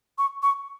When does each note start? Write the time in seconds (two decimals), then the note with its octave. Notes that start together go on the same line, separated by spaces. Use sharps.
0.18 C#6
0.43 C#6